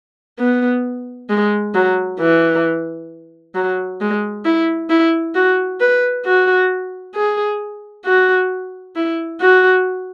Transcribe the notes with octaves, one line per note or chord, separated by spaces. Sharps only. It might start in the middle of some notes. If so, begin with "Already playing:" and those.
B3
G#3
F#3
E3
F#3
G#3
E4
E4
F#4
B4
F#4
G#4
F#4
E4
F#4